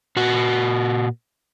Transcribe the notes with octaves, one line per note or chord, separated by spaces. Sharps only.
A#2 F#4